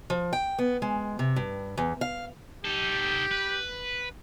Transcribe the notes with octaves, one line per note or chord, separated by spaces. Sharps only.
F3
G5
B3
G#3
C3
G2
E2
F5
D#4 G4 A4
B4